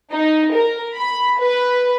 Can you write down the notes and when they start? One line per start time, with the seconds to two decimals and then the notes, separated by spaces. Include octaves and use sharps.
0.13 D#4
0.55 A#4
0.96 B5
1.39 B4